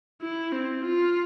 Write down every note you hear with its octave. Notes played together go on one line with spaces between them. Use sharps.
E4
C4
F4